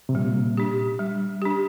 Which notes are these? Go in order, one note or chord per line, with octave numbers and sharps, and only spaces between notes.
C3
A#2 G3
D4 G4
G3
D4 G4